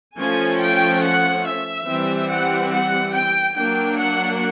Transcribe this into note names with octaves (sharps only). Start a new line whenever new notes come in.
F3 A3 C#4 G#5
G5
F#5
E5
E3 G3 C4
F#5
F#5
G5
F#3 A#3 D4 G5
F#5